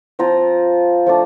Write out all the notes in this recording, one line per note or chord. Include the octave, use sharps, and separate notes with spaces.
F3 C4 F4 A#5
F3 A3 D4